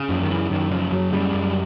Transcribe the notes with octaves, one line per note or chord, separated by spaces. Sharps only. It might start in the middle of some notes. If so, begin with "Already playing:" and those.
Already playing: C#3
F#2 F3
D#3
C#3 E3
F#2 D#3
C#3 F3
F#2 F#3
C#3 G3
F#2